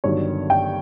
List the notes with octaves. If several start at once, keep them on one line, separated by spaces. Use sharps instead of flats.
G1 G2 D#3 F#3 C#5
G5